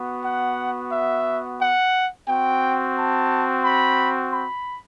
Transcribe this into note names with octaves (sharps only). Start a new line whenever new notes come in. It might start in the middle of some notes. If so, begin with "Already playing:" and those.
Already playing: B3 F#4
F#5
E5
F#5
C4 F#4 G5
A5
B5
B5